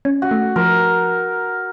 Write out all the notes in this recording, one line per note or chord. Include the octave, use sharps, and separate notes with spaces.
C#4
F#4
A3
F3 A#4